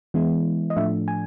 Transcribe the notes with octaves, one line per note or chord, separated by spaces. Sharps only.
E3 G#3 B3 E4
D#5
A2 F3 A3 D4 E5
G#5